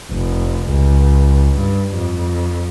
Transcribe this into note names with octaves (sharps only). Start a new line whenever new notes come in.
F1
C#2
G2
F2